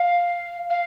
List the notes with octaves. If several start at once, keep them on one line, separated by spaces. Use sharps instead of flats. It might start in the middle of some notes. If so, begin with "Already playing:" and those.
Already playing: F5
F5